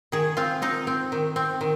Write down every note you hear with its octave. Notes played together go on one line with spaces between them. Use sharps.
D#3 G#4
C4 F4
C4 D#4
C4
D#3
C4
D#3